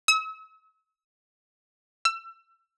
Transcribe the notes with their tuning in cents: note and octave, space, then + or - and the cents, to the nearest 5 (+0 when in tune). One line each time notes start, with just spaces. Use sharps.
E6 -40
E6 +30